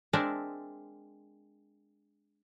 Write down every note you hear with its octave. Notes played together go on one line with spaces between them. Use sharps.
G#3 C4 D4 A#4 E5 A5